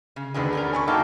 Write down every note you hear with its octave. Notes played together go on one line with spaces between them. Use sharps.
C#3
D2 D3 D#3 G#4 B4
B3 C#4 A#4
G#5 B5 C#6
F#3 A#3 D#4 A4 F5 G5 D6